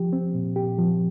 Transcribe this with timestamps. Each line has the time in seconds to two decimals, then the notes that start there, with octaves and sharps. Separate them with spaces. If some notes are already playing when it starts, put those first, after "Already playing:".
Already playing: F3 G4
0.13 C4
0.35 A#2
0.56 G4
0.78 F3